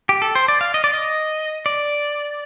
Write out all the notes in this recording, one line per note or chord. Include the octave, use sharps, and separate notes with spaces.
G4
A4
C5
D5
F5
D#5
D5
D#5
D5